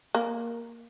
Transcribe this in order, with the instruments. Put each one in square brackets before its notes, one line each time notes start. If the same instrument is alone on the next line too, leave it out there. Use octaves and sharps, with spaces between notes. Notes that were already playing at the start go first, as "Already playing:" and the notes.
[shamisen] A#3